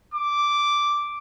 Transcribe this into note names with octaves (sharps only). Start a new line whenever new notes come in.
D6